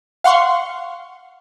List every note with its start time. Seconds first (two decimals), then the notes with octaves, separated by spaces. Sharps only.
0.24 F5 F#5 C6 C#6